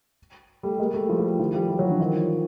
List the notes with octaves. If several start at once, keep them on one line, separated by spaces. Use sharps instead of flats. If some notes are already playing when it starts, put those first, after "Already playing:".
G3 A3
G#3 A#3
G3 A3
F3 G3
F3 G3
D#3 F3
F3 G3
F3 G3
E3 F#3
D3 E3
D#3 F3